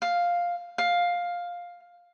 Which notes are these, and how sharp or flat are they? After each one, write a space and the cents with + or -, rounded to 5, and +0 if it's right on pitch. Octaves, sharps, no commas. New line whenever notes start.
F5 +5
F5 +10